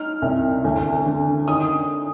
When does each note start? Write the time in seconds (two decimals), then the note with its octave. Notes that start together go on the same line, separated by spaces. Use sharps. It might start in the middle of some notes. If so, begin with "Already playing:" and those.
Already playing: D#4 F6
0.22 C2
0.64 D2
1.06 D3
1.48 D#3 D#6